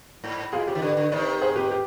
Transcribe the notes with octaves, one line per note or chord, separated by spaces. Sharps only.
G#2
B2 F4 G#4
C3 G4
D#3
D3 G4 B4
D3
C3 D#3 B4 D5
G#4 C5
G4 B4
G4